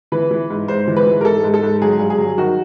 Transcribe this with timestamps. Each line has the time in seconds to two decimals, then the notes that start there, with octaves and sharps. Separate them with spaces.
0.12 E3 B4
0.31 E3
0.50 G#2
0.68 G#2 C5
0.88 E3
0.97 B4
1.06 E3
1.21 A#4
1.24 G#2 A4
1.44 G#2
1.54 A4
1.63 G#2
1.82 F#3 G#4
2.00 G2
2.10 G#4
2.18 F#3
2.38 D#3 F#4